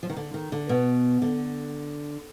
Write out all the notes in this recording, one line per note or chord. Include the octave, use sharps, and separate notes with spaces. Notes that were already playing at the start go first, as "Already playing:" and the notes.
F3
D#3
D3
D#3
D3
B2
D3